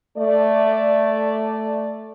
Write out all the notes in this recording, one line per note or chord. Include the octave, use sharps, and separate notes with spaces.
A3 D5